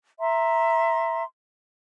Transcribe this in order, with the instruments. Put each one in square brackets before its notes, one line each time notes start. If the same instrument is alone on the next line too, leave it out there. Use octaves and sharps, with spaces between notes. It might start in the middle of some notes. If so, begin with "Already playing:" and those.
[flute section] E5 A#5 C6